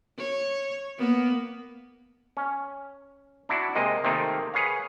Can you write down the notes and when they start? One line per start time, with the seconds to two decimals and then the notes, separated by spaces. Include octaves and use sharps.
0.18 C#5
0.98 A#3 B3
2.37 C#4
3.49 D4 E4 F#4
3.75 C3 G#3 A#3 D#5
4.04 C3 D#3 A3 A#3 C4 D#4
4.54 G#4 B4 C#5 F5